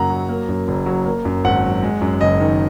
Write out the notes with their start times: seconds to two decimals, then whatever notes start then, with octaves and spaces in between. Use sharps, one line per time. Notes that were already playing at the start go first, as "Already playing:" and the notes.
Already playing: F#2 C#3 A#3 F#5 A#5
0.10 F#3
0.29 A#3
0.48 F#2
0.68 F#1
0.86 F#3
1.06 A#3
1.25 F#2
1.44 G#1 F#5
1.64 F#3
1.83 G#3
2.01 F#2
2.21 F#1 D#5
2.40 D#3